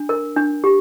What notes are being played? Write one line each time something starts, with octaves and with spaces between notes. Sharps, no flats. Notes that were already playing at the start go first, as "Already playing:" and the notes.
Already playing: D4
A#4
D4
G4